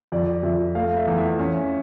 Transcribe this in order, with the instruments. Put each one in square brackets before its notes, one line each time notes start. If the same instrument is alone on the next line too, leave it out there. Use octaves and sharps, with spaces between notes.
[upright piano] F2 D5
F2 E5
A3 F5
E5
E2
E5
C#4